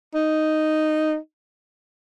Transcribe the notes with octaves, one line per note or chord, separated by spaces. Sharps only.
D#4